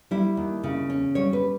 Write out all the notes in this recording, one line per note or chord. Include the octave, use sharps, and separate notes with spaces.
G3 E4
D#2
C#3
C#4
G3 C#5
B4